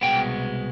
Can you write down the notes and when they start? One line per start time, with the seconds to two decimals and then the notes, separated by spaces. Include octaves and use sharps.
0.01 C2 B2 G#3 B3 G5